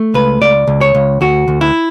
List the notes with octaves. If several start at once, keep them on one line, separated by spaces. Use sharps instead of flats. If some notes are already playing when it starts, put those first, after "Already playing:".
Already playing: A3
C#2 B4
C#2 D5
C#2
C#5
C#2
D2 F#4
D2
E4